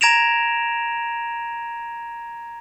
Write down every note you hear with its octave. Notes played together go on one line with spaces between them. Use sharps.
A#5 G#6 A#6 D7 E7 F7